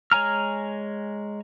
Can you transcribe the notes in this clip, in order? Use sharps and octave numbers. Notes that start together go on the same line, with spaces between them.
G#3 C#5 G#5 A#5 F6